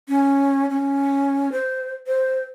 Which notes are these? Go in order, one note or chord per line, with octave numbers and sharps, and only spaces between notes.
C#4
C#4
C5
C5